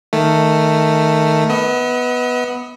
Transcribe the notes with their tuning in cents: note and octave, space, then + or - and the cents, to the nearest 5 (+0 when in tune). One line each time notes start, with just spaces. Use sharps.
D#3 +0 A3 +10
B3 +0 D#5 +45